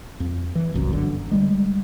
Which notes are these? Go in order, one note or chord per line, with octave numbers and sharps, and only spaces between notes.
F2
E3
F#1 C2 F#2
G1 D3
D3 G3 G#3